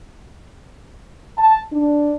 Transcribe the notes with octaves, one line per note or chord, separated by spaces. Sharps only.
A5
D4